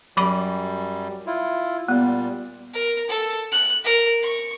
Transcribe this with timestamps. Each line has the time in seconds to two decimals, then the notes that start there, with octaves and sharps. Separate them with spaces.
0.17 F#2 F#3 G3 B5 D6
1.27 E4 F4
1.88 A#2 G3 B3
2.74 A#4
3.09 A4
3.52 F#6
3.84 A#4
4.23 C#6